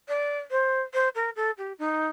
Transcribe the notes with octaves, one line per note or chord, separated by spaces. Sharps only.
D5
C5
C5
A#4
A4
G4
D#4